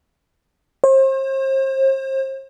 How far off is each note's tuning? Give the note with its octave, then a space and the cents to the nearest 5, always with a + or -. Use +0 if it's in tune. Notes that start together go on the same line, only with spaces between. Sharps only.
C5 +40